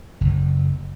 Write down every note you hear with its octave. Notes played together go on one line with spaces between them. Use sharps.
F#1